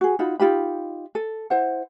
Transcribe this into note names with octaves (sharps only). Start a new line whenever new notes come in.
F#4 G#4
D#4 F4 F#4 B5
D#4 F4 G4 B5
A4
E4 C5 F#5